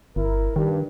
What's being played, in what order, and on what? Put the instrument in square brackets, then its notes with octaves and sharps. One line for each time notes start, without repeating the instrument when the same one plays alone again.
[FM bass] G1 [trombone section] E4 A#4
[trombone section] G2 [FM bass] D#3